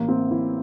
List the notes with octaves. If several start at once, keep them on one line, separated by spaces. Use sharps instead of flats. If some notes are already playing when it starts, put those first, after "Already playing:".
Already playing: A1 A#3
C4
E3 E4